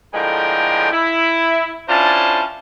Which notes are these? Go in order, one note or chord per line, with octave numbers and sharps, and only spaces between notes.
A2 D3 F3 G#3 A#4 G5
E4
C#4 D4 E4 F4 C5 A5